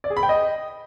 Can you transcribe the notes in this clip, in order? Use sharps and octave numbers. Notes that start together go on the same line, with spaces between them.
D5
G#4
B5
G5
D#5